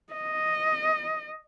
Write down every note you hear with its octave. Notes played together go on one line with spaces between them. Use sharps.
D#5